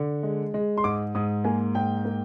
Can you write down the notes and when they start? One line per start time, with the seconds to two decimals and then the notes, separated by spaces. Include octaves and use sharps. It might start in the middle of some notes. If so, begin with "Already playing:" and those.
Already playing: D3
0.23 G#3
0.54 G#3
0.77 C6
0.84 G#2 D6
1.15 G#2 D#6
1.44 A#3 G#5
1.75 G#2 G5
2.05 A#3